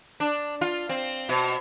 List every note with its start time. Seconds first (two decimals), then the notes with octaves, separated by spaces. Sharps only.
0.20 D4
0.61 F4
0.89 C4
1.29 B2